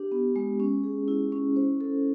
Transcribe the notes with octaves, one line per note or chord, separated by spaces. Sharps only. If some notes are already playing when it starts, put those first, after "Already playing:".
Already playing: D4 G4
B3
G#3
C#4
G#4
E4
C#4
C5
A4